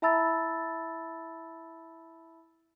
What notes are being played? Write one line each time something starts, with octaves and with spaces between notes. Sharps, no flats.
E4 E5 A5 B5 E6 A6